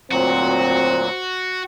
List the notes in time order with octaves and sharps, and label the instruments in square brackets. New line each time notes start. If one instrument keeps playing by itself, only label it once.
[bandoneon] D2 A#2 F#3 [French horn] C4 [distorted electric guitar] F#4 [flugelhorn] C5